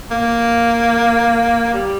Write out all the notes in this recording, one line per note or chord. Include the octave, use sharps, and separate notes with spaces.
A#3
G3